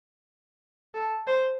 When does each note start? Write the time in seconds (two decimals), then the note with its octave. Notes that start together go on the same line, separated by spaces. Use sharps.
0.94 A4
1.27 C5